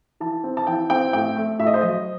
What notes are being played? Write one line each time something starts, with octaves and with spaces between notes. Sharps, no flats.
E3 A5
C4
A5
E3 G5
C4 G5
A2 G5
A3
A2 E5
D#5
C5
F#3 D#5